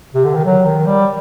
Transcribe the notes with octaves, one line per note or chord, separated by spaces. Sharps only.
C3
D3
D#3
F#3
D#3
G3